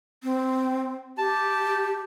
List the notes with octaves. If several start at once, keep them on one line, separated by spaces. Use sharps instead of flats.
C4
G4 A5